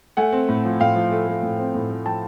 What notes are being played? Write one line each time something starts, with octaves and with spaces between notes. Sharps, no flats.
A3 F#5 G#5
C4
A2
F3
A2 F5 G5
F3
A3
A3
A2
C4
A2
A3
F3 G5 A5